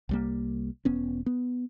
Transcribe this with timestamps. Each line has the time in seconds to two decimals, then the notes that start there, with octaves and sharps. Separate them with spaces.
0.09 C2 G3 A#3
0.85 E1 B3 C#4
1.26 B3